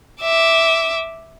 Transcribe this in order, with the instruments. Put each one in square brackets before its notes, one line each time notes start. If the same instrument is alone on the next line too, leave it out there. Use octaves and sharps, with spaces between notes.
[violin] E5 D6